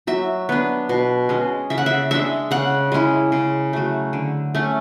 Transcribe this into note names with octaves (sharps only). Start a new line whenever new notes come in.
F#3 E5
B3 D4
B2
G#3 C#4
C#3 E5
F#5
E5
G#3 D4 E5
C#3 F#5
G#3 C#4 E4
C#3
F#3 A3
D3
A3 C#4